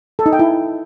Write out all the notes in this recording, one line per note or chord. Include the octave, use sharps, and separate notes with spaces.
A4
D#4
G5
E4